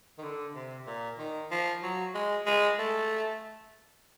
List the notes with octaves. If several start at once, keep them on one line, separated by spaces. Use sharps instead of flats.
D#3
D3
C3
A#2
D#3
F3
F#3
G#3
G#3
A3